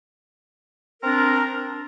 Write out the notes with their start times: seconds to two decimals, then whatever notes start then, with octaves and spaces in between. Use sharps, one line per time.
1.00 A#4
1.03 C4
1.06 D4